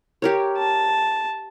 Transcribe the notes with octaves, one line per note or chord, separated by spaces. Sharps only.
G4 A#4 C#5
A5